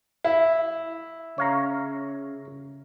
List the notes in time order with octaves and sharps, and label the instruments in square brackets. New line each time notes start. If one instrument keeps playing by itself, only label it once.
[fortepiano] E4
[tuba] C#3 [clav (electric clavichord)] C#5 F5 A#5